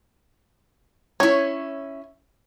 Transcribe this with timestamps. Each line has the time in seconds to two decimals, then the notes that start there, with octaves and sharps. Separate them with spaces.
1.20 C#4 E4 C#5